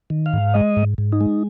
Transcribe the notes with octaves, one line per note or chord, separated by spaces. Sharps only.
D#3
F5
G#2
G#3 D#5
G#2
G#2
D#4
G#3